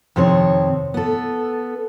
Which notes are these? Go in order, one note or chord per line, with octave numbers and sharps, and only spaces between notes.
F2 C3 D#3 C4 C#5
B3 A4